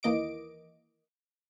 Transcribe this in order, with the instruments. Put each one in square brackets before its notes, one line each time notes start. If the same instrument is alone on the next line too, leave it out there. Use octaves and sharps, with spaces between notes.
[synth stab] D#2 E3 A#3 D#5 D6 D7